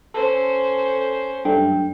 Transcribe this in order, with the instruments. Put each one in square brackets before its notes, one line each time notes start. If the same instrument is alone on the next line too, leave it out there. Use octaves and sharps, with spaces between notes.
[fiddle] C#4 C5 [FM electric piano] A4
[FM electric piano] F#2 G3 A3 [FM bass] D4 [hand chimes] G5